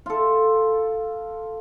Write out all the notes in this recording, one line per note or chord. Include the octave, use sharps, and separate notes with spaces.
F4 A4